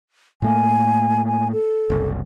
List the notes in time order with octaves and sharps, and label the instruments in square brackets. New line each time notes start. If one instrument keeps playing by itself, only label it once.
[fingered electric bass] A2 A3 A#3 [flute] G#5
[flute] G#5
A4
[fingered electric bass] F#1 C2